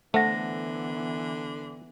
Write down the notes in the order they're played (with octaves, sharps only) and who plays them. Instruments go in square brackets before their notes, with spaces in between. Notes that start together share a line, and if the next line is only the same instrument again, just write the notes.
[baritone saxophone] D3 [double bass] E3 B3 [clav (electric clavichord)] A3 [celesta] C5 F#5 A#6